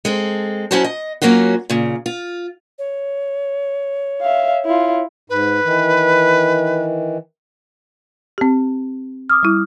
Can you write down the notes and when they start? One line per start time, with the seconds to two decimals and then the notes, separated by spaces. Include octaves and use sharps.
0.05 G#3 C4 A4
0.71 F#3 C#4 E4 F#4 C5 A5
0.84 D#5
1.22 F#3 A#3 C#4 F4 F#4
1.70 A#2 C#3
2.06 F4
2.79 C#5
4.21 E5 F5
4.65 E4 F4
5.30 G#2 B4
5.64 D#3 E3
8.38 C4 G4
9.30 D6 D#6 F6
9.43 G3 E4